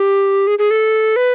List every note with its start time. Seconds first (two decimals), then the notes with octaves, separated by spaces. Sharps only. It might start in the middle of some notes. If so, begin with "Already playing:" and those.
Already playing: G4
0.47 G#4
0.59 G#4
0.71 A4
1.16 B4